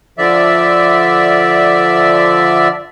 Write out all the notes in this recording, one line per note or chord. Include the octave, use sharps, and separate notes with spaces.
D3 F3 D5 E5